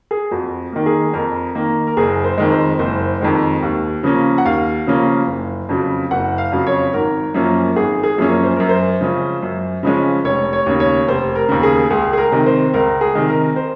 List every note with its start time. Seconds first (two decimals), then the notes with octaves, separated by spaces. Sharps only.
0.11 G#4
0.31 F2 F#4
0.72 D#3 A#3
0.86 G#4
1.14 F2 A#4
1.55 D#3 A#3
1.87 A#4
1.97 F#1 G#4
2.24 C5
2.38 F2 D#3 G#3
2.52 C5
2.79 F#1 C5
3.21 F2 D#3 G#3
3.62 D#2
4.03 C#3 F3 A#3 C#4
4.38 F#5
4.45 D#2 F5
4.87 C#3 F3 A#3 C#4
5.27 F#1
5.69 F2 C#3 F#3
6.11 F#1 F#5
6.38 F5
6.52 F2 C#3 F#3
6.67 C#5
6.93 G#1 A#4
7.34 F#2 F3 A#3 C#4
7.76 G#1 G#4
8.03 G#4
8.18 F#2 F3 A#3 C#4
8.32 C#5
8.44 C5
8.56 F#2 A#4
8.69 C5
9.01 C#3 F3 G#3 C#4
9.42 F#2
9.83 C#3 F3 G#3 C#4
10.24 F1 C#5
10.53 C#5
10.66 D#2 C#3
10.80 C#5
11.08 F1 C5
11.35 A#4
11.49 D#2 C#3
11.63 G#4
11.90 C#2 G#4
12.13 G#4
12.18 A#4
12.32 C3 D#3
12.46 C5
12.74 C#2 A#4
13.01 G#4
13.15 C3 D#3
13.28 A#4
13.56 C5